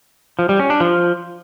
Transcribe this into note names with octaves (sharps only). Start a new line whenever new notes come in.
F3
G3
C#4
D4
F3